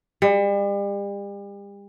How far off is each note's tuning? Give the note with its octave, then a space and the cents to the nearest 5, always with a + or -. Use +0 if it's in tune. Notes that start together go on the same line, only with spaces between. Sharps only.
G3 +40